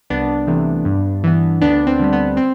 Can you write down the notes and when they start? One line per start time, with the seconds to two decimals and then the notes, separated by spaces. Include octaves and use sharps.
0.10 C2 B3 D4
0.47 C3 E3 A3
0.85 G2
1.24 E3 B3
1.61 D2 B3 D4
1.87 C4
1.99 D3 G3 B3
2.13 B3
2.37 C4